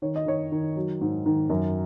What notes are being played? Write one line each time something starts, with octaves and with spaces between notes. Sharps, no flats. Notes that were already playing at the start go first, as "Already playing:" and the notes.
D#3 C#5
D#5
D#3 C#5
D#3
F#3
G#2
D#3
F#2 A#4